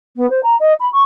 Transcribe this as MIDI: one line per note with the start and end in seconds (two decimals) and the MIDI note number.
0.16 0.28 59
0.29 0.40 72
0.43 0.54 82
0.59 0.72 75
0.79 0.88 83
0.92 1.02 85